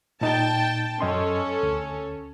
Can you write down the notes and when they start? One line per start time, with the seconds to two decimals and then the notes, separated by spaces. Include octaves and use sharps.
0.21 A#2 D#4 G5 A5
1.01 F#2 C#4 A4 D#5 C6
1.63 D2